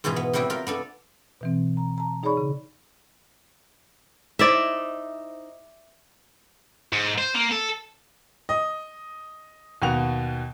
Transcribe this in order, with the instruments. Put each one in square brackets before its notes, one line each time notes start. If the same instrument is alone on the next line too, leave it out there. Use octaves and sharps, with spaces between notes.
[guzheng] G#2 B2 E3 F4 G#4
B3
C3 F#3 G3 E4 G4
F4 A#4
B3 D4 A4
[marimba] B2 E3 C4
A#5
A5 A#5
D#4 G#4 C#5 D5 B5 C#6
C#3
[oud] D#4 E4 C5 [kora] D5 E5
[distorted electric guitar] G#2
C5
A#3
A4
[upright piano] D#5
D#2 B2 F#5 F7